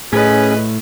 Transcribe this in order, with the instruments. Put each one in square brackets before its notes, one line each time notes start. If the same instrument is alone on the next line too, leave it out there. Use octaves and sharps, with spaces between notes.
[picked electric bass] A2 [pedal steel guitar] C#4 [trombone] G#4 [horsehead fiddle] B4 D#5